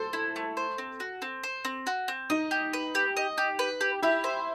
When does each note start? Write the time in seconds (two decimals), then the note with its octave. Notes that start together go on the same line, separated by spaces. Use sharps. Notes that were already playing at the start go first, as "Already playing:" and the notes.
Already playing: A4 C5
0.13 E4
0.36 A3
0.57 C5
0.78 C4
1.00 F#4
1.22 C4
1.43 C5
1.65 C4
1.87 F#4
2.08 C4
2.30 D#4 D#5
2.51 G4
2.73 B4
2.95 G4
3.17 D#5
3.38 G4
3.59 B4
3.81 G4
4.02 E4 G4
4.24 C5